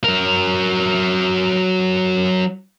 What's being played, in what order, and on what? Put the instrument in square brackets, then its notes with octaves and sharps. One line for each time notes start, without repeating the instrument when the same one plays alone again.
[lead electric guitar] F#3 A#4